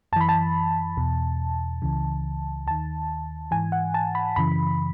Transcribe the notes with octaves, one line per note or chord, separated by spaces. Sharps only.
F#2 E3 A5 B5
A5
E2 B2
C#2 C#3 E3
D#2 D#3 A5
G#2 E3 G#5
F#5
A5
B5
F#2 C#3 E3 B5